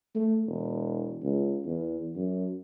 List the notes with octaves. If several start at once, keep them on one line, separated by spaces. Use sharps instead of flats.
A3
E1
C#2
E2
F#2